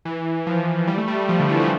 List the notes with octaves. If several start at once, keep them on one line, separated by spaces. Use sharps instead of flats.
E3
F3
G3
A3
G3
G3
F3
D3
E3
A3